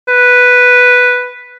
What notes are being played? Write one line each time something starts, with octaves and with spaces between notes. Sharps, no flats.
B4